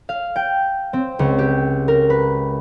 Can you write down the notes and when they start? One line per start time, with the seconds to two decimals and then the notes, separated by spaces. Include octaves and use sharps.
0.09 F5
0.36 G5
0.93 C4
1.19 C#2
1.39 G4
1.88 A#4
2.10 B4